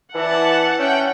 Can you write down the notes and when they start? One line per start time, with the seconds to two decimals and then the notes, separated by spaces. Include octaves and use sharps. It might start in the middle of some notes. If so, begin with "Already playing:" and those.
0.15 E3 D5 E5 F#5 A5
0.79 C#4 E5 G5